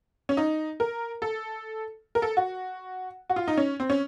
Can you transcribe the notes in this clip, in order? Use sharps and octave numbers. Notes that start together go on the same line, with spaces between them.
C#4
D#4
A#4
A4
A#4
A4
F#4
F#4
F4
D#4
C#4
C4
C#4